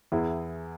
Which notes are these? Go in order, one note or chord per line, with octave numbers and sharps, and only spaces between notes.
E2 E4 G#4